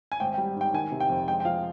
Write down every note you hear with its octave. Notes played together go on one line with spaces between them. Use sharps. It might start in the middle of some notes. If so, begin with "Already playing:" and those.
G#5
G#1 G5
G5
G3
G#2 G5
D#3 G#5
C3
G5
F2
G#3 G5
G5
F3 F5